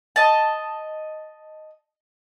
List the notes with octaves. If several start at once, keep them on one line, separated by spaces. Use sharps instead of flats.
D#5 A5